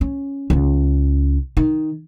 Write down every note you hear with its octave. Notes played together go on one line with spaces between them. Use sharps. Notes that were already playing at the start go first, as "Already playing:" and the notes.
C#4
C#2 C#4
D#3